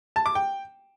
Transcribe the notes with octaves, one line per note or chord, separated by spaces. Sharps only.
A5
D6
G5